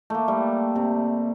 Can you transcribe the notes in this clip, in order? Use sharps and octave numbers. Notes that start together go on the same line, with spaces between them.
A3 A#3
G3
C3